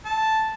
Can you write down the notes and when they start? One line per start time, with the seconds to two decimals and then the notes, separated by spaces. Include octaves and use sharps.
0.05 A5